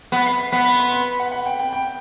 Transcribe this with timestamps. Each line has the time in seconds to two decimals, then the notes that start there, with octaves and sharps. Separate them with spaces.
0.12 B3 B6
0.26 C7
0.39 B6
0.52 B3 B6
0.65 B6
0.79 C6
0.93 B5
1.20 F#5
1.32 F#5
1.46 G5
1.59 G5
1.73 G5